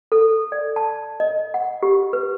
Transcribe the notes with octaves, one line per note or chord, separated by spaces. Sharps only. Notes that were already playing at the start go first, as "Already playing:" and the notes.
A4
D5
A5
D#5
F#5
G4
B4